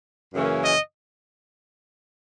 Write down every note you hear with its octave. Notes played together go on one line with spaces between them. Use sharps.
F#2 C#3 E3 A#3 C#4
D#5